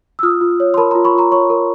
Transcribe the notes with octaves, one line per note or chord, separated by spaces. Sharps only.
E6
F4 D#6 F6
F4
C#5
C6
A#4 A5 B5
F4 A#5 C6
B5 C#6
F4 A#5 C6
C#5 B5 C#6
A#4